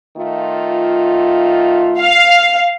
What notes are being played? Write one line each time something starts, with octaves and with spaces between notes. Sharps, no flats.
D#3 A3 F4
F5